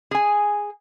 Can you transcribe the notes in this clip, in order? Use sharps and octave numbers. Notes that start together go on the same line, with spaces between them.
G#4 G#5